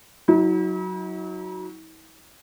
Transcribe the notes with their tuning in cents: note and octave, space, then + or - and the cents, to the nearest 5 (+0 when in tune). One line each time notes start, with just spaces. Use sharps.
F#3 +0 E4 -45